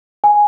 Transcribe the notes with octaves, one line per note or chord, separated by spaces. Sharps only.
G#5